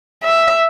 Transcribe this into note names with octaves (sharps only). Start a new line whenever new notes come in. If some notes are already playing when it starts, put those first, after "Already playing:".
E5